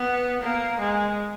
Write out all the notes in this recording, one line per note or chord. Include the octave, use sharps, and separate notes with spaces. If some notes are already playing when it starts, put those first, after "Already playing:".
Already playing: B3
A#3
G#3